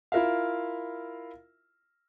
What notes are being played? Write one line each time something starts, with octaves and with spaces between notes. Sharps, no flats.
E4 F4 A#4 E5 F5